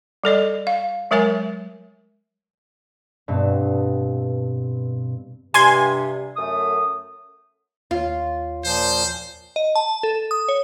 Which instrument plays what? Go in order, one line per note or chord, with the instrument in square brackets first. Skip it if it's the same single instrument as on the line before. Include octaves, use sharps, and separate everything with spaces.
[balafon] G3 A4 D5 D#5
F5
F#3 G#3 A#4 C#5 E5 G#5
[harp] G2 B2 C4
[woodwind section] G2 C3 [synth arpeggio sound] G#5 C6 G#6
[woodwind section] F#2 A3 D#6
[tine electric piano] D#2 C#5 [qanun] F4
[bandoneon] A#2 F3 [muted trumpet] C5
[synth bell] D#5
A5
A4
D#6
C#5